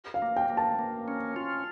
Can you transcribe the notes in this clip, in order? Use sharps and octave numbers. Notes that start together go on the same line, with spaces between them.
F5
A#3
G5
A#3
A5
A#3
C#4
F4